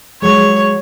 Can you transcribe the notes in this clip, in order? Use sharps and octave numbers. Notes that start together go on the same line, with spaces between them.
F#3 G#3 C#5